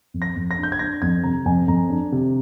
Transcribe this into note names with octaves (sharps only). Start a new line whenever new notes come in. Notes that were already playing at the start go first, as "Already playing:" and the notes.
F2
A#6
F2
A#6
D4
G6
G#6
D4 A#6
F2 G#6
C3 A#5
F2 G#5
F2 A#5
D4
C3